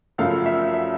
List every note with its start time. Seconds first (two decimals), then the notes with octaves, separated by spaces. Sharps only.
0.18 F#2 C#3 F3 A3 F5
0.46 E5
0.74 E5